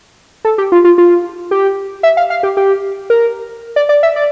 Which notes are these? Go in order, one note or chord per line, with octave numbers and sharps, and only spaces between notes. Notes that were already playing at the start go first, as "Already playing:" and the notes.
A4
G4
F4
F4
F4
G4
E5
F5
F5
G4
G4
A#4
D5
D5
E5
D5